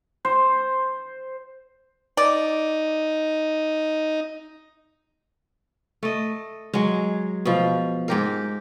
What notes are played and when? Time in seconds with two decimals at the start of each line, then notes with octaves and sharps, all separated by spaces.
0.25 C5
2.17 D#4 D5
6.03 A3 D#5
6.74 F#3 G#3
7.45 B2 F3
8.08 G#2 G4 A#4